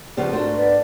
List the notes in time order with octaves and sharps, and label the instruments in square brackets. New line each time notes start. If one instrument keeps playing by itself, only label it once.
[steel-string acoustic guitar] C#3 F3 B3 [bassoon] G3
[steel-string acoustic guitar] G#2 A3 D4 [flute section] F#4 A#4 C6
[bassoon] B3 [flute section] A#4 D5